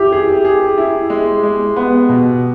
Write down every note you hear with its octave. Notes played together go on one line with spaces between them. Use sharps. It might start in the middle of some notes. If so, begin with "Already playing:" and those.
Already playing: E4 G4
G#4
G#4
E4
G#3
G#3
B3
B2